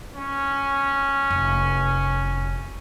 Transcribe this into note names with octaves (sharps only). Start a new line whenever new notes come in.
C#4
F1